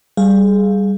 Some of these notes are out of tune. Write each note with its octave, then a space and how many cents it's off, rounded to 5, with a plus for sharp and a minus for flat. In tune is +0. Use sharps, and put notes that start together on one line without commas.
G3 +0 G#4 +20 F5 +0